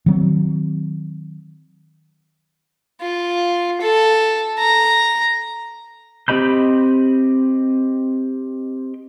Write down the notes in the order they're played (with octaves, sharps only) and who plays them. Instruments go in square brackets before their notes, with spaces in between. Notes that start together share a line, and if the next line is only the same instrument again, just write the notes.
[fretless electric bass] D#3 F#3 C4
[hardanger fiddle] F4
A4
A#5
[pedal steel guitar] C4 G4 D#5 B5 G6